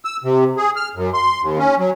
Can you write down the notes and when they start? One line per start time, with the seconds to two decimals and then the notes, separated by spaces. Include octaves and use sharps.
0.05 E6
0.24 C3
0.57 G#4
0.76 F6
0.95 F#2
1.14 C6
1.42 D#2
1.59 C#4
1.78 F#3